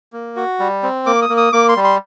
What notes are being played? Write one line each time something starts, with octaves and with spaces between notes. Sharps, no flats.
A#3
F#4
G3
C4
A#3 D6
D#6
A#3
D#6
A#3 D6
C6
G3
C6